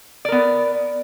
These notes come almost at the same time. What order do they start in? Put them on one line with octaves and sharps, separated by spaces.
D5 A#4 B3